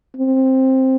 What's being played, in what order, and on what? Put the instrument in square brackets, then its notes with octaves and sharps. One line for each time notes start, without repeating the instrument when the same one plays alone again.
[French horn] C4